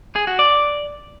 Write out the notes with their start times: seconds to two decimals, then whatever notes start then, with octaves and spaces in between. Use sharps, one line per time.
0.16 G#4
0.27 F#4
0.39 D5